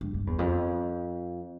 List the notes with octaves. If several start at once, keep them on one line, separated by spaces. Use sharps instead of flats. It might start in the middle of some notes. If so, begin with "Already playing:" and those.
G2
G2
E2
F2